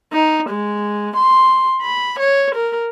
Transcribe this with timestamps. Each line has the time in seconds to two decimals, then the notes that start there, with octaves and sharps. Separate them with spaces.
0.13 D#4
0.50 G#3
1.17 C6
1.82 B5
2.20 C#5
2.55 A#4